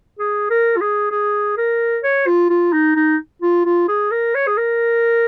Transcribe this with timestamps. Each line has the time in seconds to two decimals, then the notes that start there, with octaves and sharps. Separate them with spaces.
0.19 G#4
0.50 A#4
0.77 F4
0.81 G#4
1.11 G#4
1.57 A#4
2.04 C#5
2.27 F4
2.50 F4
2.73 D#4
2.96 D#4
3.42 F4
3.65 F4
3.88 G#4
4.11 A#4
4.35 C#5
4.47 G#4
4.57 A#4